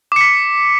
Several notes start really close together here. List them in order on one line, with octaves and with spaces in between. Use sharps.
D6 C#7 B6